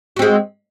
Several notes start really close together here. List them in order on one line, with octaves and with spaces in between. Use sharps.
F#4 C4 G#3